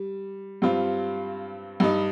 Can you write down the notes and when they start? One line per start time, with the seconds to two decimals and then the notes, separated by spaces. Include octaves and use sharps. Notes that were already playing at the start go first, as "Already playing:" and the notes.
Already playing: G3
0.62 G2 G3 C4 F4
1.80 G2 G3 D#4